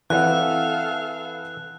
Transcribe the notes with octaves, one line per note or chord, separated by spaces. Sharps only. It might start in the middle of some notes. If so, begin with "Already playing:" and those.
E3 C4 A4 B4 F5 F#5 F#6